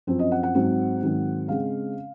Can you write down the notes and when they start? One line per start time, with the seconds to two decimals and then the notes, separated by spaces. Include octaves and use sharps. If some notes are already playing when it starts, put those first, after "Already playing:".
0.07 F#2 F3 C4
0.19 D#5
0.32 F#5
0.43 F#5
0.55 G#2 F#3 C4
1.01 G#2 D#3 F#3 C4
1.48 C#3 G#3 C4 F5